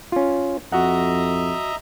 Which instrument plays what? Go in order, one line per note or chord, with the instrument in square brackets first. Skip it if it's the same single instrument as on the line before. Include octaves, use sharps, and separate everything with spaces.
[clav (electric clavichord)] C#4 F4
[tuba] F2 [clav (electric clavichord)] F#4 F#5 [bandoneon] D#5 E5 A#5